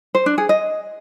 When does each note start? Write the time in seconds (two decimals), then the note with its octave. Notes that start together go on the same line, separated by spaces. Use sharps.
0.15 C5
0.26 D4
0.38 G#4
0.49 D#5